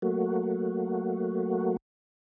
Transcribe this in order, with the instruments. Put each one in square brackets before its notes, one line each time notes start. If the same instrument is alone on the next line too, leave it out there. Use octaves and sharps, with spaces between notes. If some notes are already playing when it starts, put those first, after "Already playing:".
[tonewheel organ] F#3 A3 A#3 F#4